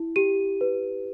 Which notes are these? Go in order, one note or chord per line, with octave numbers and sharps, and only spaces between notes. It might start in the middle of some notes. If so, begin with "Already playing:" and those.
Already playing: E4
G4 D#7
B4